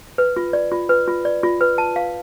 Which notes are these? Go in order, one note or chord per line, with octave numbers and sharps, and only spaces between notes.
B4
F4
D5
F4
B4
F4
D5
F4
B4
A5
F5